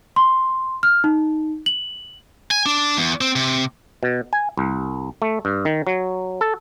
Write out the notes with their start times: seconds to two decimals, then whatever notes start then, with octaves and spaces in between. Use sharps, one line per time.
0.16 C6
0.83 F6
1.04 D#4
1.66 F#7
2.51 G#5
2.66 D4
2.97 E2
3.21 C4
3.36 C3
4.03 B2
4.33 G#5
4.58 C2
5.22 A3
5.45 G2
5.65 D#3
5.87 F#3
6.41 A4